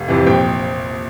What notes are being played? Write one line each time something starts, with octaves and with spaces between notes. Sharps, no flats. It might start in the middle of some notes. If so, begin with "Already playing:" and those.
Already playing: F1 F5
F2 C3 E3
A#1 G5